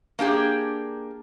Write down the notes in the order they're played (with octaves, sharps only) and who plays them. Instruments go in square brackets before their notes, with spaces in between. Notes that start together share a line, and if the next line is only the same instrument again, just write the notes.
[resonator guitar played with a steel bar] A#3 D4 G4 G#4